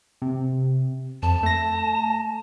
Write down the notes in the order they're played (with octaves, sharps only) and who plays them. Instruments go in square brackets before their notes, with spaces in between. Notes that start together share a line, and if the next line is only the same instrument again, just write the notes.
[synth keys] C3
[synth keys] F2 [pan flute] A5
[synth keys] A3 A#6